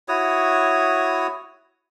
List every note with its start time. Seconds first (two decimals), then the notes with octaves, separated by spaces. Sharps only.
0.08 E4 F#4 C#5 D#6